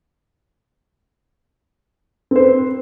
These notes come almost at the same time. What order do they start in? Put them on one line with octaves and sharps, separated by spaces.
C4 C5 B4